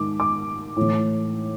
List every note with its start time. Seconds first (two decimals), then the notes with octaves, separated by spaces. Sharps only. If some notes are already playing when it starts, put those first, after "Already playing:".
Already playing: G#2 D#3 D6
0.20 D6
0.76 A2 E3